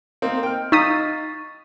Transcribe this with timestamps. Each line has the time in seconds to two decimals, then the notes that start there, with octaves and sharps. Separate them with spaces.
0.22 A#3 C4 D#4
0.43 G5 F6
0.72 D#4 F5 C#6 D#6 A6 B6